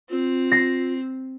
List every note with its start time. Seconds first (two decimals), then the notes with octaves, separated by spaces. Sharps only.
0.10 C4 F4
0.52 A#6 C7